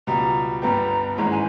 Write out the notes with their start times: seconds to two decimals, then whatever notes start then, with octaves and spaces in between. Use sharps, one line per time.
0.07 C#2 B2 G3 A#5
0.62 G1 G2 G3 B3 G4 A#5
1.17 G#1 G#2 E3 G#3 C#4 A#5
1.31 G#5